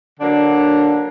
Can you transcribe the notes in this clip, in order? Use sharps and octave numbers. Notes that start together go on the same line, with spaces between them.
D3 F#3 A#3 D4